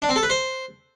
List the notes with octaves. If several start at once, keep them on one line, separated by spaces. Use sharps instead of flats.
D4
C4
A4
B4
C5